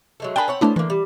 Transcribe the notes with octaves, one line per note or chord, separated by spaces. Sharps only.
F#3 G#3 A3
D4 G#4 A#4 G5 A5 B5
C4 C#5 F#5
A3 B3 C#4 D4 E4 C5
D3 E3 A#3
G3